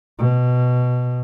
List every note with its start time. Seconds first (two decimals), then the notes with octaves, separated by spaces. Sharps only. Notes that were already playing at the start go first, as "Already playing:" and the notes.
0.19 B2